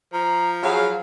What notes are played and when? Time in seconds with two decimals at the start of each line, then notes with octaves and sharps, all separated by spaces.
0.13 F3 A#5
0.63 F#3 G#4 F5 B5